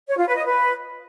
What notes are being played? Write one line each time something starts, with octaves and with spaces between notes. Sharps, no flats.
C#5
F4
B4
D#5
B4